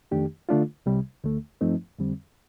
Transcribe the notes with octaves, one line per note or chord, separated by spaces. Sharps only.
F2 D#3 A3 D4 G4
D3 A3 D4 F4
C2 C3 G3
D2 D3 A3
G2 F3 A3 C4 D#4
F2 D3 G3 C4